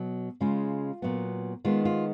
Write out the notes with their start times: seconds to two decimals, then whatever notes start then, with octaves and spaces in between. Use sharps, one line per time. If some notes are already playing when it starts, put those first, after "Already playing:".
Already playing: B2 F#3 B3
0.41 C#3 G#3 C#4 F4
1.02 A#2 F#3 B3
1.65 D#3 G#3 B3 F4
1.85 F4